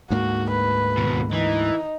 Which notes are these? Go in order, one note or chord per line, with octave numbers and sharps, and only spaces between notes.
D2 G#2 A#3 F#4
B4
D#2 B2
E3 D#4